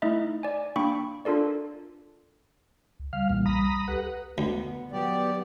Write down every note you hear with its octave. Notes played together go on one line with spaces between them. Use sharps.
A3 D#4 E4 D#5 E5
D5 G#5
A#3 D4 G5 B5 C#6
D4 F4 A4 A#4 D5
C#2
C#3 G3 F5
B1 E2 A#2
A#5 B5 D#6
C#2 G4 A4 B4 F#5
D2 B3
D#3 F#3 B3 G4 D5